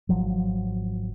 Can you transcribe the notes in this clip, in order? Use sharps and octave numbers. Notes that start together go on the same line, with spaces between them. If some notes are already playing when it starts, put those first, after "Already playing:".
G#1 F3 F#3